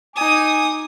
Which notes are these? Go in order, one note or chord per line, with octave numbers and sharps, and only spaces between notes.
D#4 G#5 D6 D#6